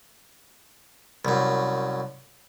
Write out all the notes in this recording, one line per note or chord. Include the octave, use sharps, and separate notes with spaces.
C2 F#2